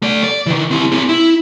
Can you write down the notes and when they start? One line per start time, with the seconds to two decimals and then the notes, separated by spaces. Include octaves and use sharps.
0.02 A3 D5
0.23 D5
0.46 D#3 E3
0.71 C4 E4
0.92 C4 G#4
1.09 E4